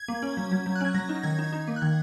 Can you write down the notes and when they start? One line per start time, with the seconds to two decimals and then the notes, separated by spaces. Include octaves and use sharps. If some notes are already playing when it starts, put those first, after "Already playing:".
Already playing: G#6
0.08 A#3
0.23 C#4
0.37 F#3
0.51 F#3
0.66 F#3
0.75 F#6
0.81 C#4 G#6
0.94 F#3 A#6
1.09 D#4
1.23 D#3 G#6
1.39 D#4
1.52 D#4
1.67 A#3
1.76 F#6
1.82 D#3 G#6